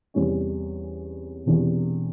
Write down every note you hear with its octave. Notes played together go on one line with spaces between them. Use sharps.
E2 C3 E3 G3 C#4
E1 E2 C3 E3